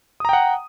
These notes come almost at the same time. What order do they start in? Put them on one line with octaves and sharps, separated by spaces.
D#6 A#5 G5 F#5